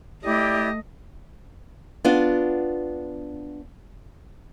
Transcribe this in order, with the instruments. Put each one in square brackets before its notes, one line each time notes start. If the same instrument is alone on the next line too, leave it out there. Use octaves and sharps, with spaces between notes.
[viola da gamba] A3 D#5 [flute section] E4 G4 D5
[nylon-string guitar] B3 D4 F4